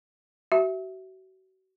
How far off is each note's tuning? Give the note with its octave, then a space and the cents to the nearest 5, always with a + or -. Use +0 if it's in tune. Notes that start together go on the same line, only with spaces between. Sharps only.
F#4 +35 E5 +0